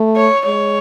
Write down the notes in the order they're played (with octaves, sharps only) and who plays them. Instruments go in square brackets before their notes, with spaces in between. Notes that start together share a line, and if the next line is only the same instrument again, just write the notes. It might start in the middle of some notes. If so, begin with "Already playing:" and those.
Already playing: [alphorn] A3
[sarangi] C#5
[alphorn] G#3 [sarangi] C#5